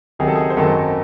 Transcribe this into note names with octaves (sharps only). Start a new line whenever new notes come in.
C#2 C3 D#3 F#3 G#4
A4
G#4
C5
G#1 F#2 D#3 F#3 A4